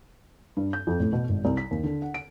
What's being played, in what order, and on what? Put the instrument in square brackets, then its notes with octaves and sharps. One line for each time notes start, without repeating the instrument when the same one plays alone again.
[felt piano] G2
G6
F2
A1
B2
G#1
C2
B6
D#2
D3
F#5
D7